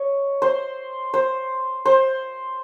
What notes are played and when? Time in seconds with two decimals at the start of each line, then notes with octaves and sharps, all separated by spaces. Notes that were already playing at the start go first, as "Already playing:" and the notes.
Already playing: C#5 D#5
0.42 C5
1.14 C5
1.85 C5